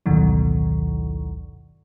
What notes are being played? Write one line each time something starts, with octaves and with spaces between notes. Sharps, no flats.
A1 D2 G2 B2 D#3 F#3